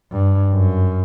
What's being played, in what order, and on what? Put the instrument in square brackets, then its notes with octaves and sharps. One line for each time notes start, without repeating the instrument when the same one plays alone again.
[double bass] G2
F#2